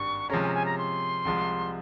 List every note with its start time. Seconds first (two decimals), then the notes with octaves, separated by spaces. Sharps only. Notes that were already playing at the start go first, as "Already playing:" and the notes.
Already playing: G#1 G2 G3 C#6
0.30 C3 F3 G#3 C#4 A#5
0.42 G#5
0.48 A#5
0.54 G#5
0.66 A#5
0.78 C6
1.25 C2 C3 F3 G#3